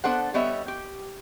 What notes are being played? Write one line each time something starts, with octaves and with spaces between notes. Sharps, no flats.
B3 D4 A4 C5 F#5
G3 B3 C#5 D#5 E5
G4